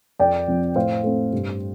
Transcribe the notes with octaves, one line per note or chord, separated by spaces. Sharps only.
F2 D5 G5
F3 C4
A2 C5 F5
A3 C4
G2